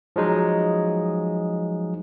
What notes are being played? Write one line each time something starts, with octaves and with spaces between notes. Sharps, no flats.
F3 F#3 G#3 D#4